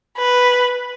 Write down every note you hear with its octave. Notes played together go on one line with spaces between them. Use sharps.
B4